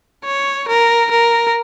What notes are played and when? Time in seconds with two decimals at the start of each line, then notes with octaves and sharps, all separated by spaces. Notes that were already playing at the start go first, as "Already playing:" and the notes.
0.25 C#5
0.68 A#4
1.11 A#4